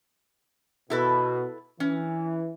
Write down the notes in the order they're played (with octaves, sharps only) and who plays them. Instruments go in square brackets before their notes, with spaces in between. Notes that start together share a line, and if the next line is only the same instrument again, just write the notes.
[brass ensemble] B2 [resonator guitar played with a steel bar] E4 A4 B4
[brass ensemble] E3 [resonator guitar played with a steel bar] C#4